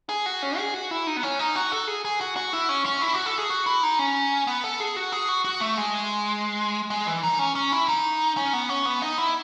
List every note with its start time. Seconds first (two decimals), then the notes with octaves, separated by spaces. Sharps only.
0.09 G#4
0.26 F#4
0.43 C#4
0.58 G#4
0.74 F#4
0.91 E4
1.07 D#4
1.17 B3
1.23 C#4
1.39 D#4
1.55 F#4
1.72 A4
1.87 G#4
2.05 G#4
2.21 F#4
2.37 F#4
2.53 E4
2.69 C#4
2.86 C#4
3.02 E4
3.14 F#4
3.26 A4
3.38 G#4
3.50 F#4
3.66 E4
3.83 D#4
3.99 C#4
4.47 B3
4.64 A4
4.80 G#4
4.96 F#4
5.12 G#4
5.29 F#4
5.45 F#4
5.61 A3
5.78 G#3
6.90 G#3
7.07 E3
7.23 D#4
7.39 C#4
7.55 C#4
7.72 E4
7.88 D#4
8.37 C#4
8.53 B3
8.69 C#4
8.85 B3
9.02 D#4
9.18 E4